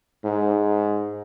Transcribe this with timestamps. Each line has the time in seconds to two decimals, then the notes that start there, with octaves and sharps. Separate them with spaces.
0.24 G#2